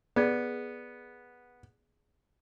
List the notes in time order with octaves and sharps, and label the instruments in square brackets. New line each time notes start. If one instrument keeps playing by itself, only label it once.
[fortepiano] B3 [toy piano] G#4 D5